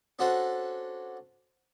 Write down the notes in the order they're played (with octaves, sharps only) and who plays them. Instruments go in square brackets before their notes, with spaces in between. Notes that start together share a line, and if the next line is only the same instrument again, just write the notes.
[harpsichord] C#4 D4 F#4 A4 C5